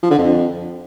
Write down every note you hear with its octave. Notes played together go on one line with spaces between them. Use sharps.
F3
D3
F2